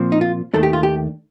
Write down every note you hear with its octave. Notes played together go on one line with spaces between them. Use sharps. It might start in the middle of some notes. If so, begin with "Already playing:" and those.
Already playing: A#2 F3 C4
D#4
F4
D#2 D#3 A3 D4 A4
G4
F4
G4